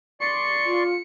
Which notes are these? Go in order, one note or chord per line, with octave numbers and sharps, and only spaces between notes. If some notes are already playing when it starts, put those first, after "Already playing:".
D5 C6 C#6 C#7
F4